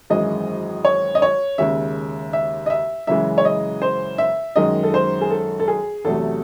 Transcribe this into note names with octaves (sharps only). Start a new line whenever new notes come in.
G#1 F#2 E3 G#3 D#5
C#5
D#5
C#5
D#2 C#3 G#3 E5
E5
D#5
E5
F#2 C#3 E3 G#3 E5
C#5
D#5
C5
E5
F#2 D#3 G#3 D#5
A4
C5
G#4
A4
A4
G#4
E2 C3 F#3 A3 A4